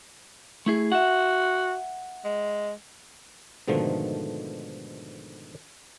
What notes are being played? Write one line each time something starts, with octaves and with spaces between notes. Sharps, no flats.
A3 E4 G#4
F#4 E5 F#5
G#3
G#2 B2 D3 D#3 F3 A3